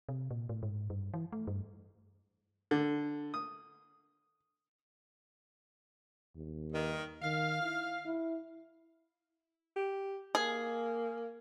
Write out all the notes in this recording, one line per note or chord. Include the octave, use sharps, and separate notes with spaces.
C3
A#2
A2
G#2
G2
E3
A3
G2
D3
D#6
D#2
G2 D#3
D#3 F5
E4
E4
G4
A#3 G#4